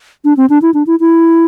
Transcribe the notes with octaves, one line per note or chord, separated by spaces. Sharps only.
D4
C4
D4
E4
D4
E4
E4